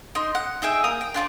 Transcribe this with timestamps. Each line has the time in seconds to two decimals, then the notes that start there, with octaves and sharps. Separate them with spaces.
0.15 D#4 C6
0.35 F#5
0.62 D#4 G#4 E5 G5
0.84 A#3 A#5 D#6
1.01 G5
1.14 D4 F4 A4 D5